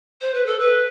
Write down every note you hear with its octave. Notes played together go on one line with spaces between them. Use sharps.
C5
B4
A4
B4